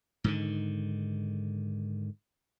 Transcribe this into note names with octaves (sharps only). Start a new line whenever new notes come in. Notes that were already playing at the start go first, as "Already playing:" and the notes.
G#2 D3 D#3